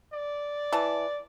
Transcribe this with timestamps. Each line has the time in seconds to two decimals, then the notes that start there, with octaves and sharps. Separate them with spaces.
0.13 D5
0.72 E3 A5